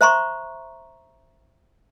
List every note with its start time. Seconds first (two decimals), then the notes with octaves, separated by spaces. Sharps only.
0.01 C5 E5 A#5 C6 C#6